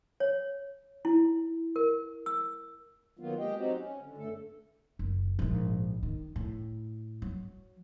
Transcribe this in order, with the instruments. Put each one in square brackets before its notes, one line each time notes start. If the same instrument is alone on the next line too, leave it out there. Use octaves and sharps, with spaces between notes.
[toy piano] C#5
E4
A#4
E6
[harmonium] D#3 F#3 A#3 B3 F4
G#3 G4 D#5 G5
F#3 C4 D#4 F#4 G4
C#4
D3
G2 A3 A4
[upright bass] F#1
A#1 G#2
D#3
A2
F#3